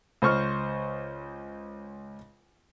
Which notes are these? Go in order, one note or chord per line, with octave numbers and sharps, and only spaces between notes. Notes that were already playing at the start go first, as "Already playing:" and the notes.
C#2 C5 C6 C#6 F6